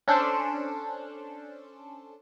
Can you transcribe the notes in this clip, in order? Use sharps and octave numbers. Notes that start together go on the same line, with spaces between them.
C#4 D4 A4 C5